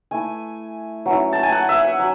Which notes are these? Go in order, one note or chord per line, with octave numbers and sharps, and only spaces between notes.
A3 E4 G#5
F#3 C#4 E4
A5
G#5
F#5
E5
F#5
F#3